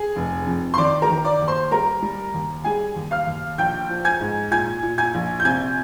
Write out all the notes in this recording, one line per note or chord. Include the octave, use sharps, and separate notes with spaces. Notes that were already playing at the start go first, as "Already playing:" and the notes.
Already playing: G#4
F1
F2
C6
D#3 D5 D6
A#4 A#5
D#3
D5 D6
D#2
C5 C6
G3 A#4 A#5
G3
D#2
G3 G#4 G#5
D#2
F5 F6
D#2
A#1 G5 G6
F3
G#5 G#6
G#2
A#2 G#5 G#6
A#2
G#5 G#6
A#1
G6
C3 G#5 G#6